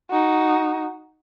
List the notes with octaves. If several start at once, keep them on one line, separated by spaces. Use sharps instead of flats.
D#4 F#4